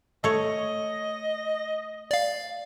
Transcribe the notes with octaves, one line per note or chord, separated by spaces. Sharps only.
A3 C#5 D#5
D5 F5